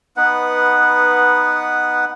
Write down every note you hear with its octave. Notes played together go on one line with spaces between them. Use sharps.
B3 D#4 B4 F#5